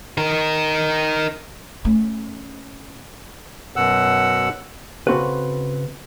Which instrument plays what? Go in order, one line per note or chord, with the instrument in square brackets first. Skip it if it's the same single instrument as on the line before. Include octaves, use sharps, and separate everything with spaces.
[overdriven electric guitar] D#4 A#4
[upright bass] A3 C#4
[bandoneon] F#2 B2 F#5 E6
[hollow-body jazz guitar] C#3 A#3 C4 F#4 A4 B4